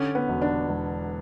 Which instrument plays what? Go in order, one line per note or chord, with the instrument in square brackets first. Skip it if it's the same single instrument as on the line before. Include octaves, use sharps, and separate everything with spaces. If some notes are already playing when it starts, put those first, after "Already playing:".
Already playing: [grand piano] D3 [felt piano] C#4
[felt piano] B3
[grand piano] E1
[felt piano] D4
[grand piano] E1